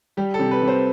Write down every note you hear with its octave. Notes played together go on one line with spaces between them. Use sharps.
G3 G4
A4
C3
B4
C3
C5